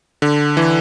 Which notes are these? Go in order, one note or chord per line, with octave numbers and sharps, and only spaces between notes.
D3
E3